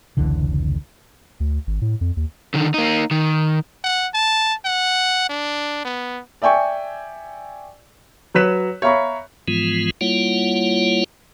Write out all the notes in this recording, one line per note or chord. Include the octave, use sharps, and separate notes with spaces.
F1 C#2 D3 E3
D2
G#1
A2
F2
D#2
D3 D#3
A#3 D#4
D#3
F#5
A5
F#5
D4
B3
D5 E5 G5 G#5 C#6
F#3 B4 C#5 F#6 B6 E7
C#5 E5 F5 A#5 B5 C#6
G#2 E3 F3 G#3 B3 F4
G3 A#3 E4 F4 C#5 F#5